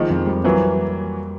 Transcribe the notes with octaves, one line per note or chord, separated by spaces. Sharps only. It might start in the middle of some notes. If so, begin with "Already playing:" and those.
Already playing: D#3 F3 G#3 A#3
F2
G3
E3 F#3 A#3